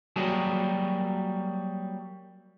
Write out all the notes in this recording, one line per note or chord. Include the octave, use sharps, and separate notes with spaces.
F#3 G3 A#3 G#4